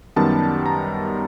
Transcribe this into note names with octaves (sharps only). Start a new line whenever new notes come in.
F#2 D#3 G3 B3 A5
A#5